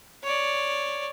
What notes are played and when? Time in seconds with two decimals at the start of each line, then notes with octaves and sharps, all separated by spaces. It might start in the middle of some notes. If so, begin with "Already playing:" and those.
0.23 C#5 D5